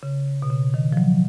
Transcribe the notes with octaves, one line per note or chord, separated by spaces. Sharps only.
C#3
B2
C#3
D#3
F3
F#3